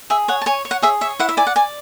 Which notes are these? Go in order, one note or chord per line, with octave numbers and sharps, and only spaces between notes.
G#4 E5
C#5 F#5
A5
C#5 G#5
C#5
F#5
G#4 E5
C#5 E5
E4 F#5
E5
D5 G#5
F#5
D5 G#5